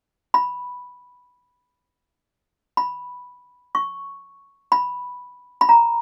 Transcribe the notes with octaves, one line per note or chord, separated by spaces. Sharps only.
B5
B5
C#6
B5
B5
A#5